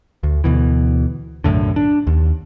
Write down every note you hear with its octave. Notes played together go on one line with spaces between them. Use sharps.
D2
D2 B2 E3
B1 F#2 A2 D3
D4
D#2